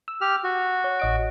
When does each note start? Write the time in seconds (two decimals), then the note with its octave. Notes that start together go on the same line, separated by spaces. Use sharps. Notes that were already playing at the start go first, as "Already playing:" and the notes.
0.08 E6
0.21 G4 F6
0.44 F#4
0.84 C#5
1.00 A1 D#5 D7